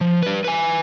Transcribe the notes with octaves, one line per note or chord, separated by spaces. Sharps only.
F3
G3 B4
B4 G#5